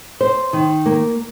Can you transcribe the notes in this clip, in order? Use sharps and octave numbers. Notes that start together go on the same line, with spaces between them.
C5
D#3
A#3